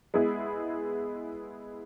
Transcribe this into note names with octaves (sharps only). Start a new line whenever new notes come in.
G#3 B3 E4 G#4